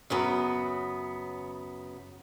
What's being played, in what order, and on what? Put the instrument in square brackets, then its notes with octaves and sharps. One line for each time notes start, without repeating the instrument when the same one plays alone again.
[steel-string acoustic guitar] F#2 C#3 B3